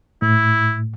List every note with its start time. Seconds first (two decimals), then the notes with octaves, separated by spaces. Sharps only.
0.22 A2 E4